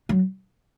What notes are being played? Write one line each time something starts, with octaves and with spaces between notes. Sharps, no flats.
F#3